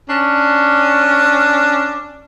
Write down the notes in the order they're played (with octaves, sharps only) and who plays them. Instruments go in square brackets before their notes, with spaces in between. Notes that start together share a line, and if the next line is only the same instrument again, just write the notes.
[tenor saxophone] C#4 [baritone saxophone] D4